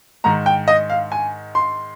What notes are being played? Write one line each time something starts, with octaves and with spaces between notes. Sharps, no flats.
G#2 D#3 A#5
G5
D#5
F5
G#5
C6